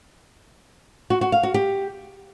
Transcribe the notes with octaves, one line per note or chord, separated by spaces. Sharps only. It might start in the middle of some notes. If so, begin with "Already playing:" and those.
F#4
F#4
F5
F#4
G4